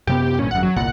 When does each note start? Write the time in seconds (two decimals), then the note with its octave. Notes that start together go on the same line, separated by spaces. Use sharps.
0.07 F#2 C3 B3 G4
0.39 G#1 G2 A#2 C#4
0.51 G#1 F#2 F#5
0.63 F#3
0.76 G1 C2 A#2 F#5